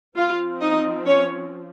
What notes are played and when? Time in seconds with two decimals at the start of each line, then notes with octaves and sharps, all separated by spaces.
0.17 F3 C4 F4 F5
0.61 D#4 D#5
1.05 C#4 C#5